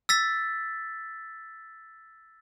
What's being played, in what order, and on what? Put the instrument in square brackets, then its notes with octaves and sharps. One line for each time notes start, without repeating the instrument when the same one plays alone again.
[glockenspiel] E6 A6 B6